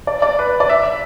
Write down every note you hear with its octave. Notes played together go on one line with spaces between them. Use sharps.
D5
D5
B4
D5
E5